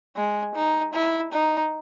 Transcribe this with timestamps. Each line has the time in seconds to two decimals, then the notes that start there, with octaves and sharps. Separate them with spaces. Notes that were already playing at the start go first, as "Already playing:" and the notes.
0.15 G#3
0.55 D#4
0.93 E4
1.32 D#4